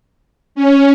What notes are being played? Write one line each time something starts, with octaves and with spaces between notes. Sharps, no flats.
C#4